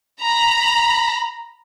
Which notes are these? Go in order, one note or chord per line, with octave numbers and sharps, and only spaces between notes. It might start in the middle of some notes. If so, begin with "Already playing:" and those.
A#5 B5